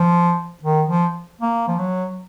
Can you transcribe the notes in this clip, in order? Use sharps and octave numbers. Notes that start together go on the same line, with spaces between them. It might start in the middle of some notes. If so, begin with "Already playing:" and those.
Already playing: F3
D#3
F3
A#3
F3
F#3